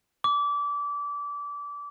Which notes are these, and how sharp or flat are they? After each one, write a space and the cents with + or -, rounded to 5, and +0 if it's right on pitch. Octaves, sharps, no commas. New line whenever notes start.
D6 -25